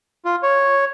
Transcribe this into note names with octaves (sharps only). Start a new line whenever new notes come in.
F4
C#5